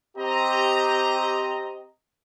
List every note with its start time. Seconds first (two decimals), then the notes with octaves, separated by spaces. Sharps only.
0.17 C4 G4 D#5 A#5